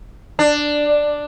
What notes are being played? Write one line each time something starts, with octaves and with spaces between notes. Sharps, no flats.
D4